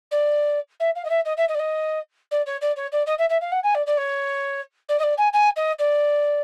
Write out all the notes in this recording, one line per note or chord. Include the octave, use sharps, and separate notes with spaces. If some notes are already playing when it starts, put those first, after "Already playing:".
D5
E5
F5
D#5
E5
D#5
E5
D#5
D5
D#5
D5
C#5
D5
C#5
D5
D#5
E5
E5
F5
F#5
G#5
D5
D5
C#5
D5
D#5
D5
G#5
G#5
D#5
D5